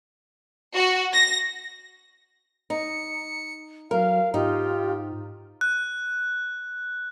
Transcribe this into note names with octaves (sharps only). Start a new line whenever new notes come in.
F#4
A#6
D#4 C#7
F#3 A#4 F5
G#2 D#4 F4 G4
F#6